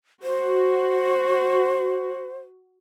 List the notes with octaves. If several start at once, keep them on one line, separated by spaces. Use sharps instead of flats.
F#4 C5